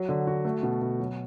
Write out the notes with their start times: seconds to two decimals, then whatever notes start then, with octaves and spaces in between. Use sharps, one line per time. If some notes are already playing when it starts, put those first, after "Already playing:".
Already playing: F#3
0.09 D3
0.27 F#4
0.45 A3
0.63 B2
0.81 B2
1.00 F#3